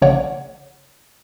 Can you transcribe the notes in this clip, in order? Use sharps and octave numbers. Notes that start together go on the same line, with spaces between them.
A#1 C#3 C#5 D5 F#5